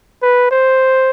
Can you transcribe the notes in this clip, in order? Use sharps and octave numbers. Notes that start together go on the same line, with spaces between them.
B4
C5